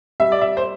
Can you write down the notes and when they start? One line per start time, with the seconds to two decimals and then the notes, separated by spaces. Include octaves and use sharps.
0.20 G3 E5
0.32 D5
0.41 E5
0.57 C5